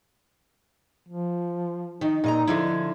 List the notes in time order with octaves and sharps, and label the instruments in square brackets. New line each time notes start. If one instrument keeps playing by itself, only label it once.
[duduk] F3
[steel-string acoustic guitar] D#3 [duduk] D#4
[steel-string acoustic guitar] A#2 D#5 A#5
D3 F3 E4